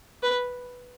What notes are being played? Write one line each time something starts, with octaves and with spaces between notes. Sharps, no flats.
B4